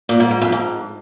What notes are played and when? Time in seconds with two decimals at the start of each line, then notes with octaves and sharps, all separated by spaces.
0.09 A#2
0.20 G#2
0.31 G#2
0.41 F2
0.52 G#2